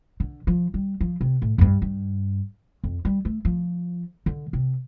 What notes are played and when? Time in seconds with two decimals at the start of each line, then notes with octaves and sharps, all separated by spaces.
0.20 D3
0.47 F3
0.74 G3
1.01 F3
1.21 C3
1.42 A2
1.58 F2
1.61 G2
1.82 G2
2.84 F2
3.05 G3
3.25 A3
3.45 F3
4.26 D3
4.53 C3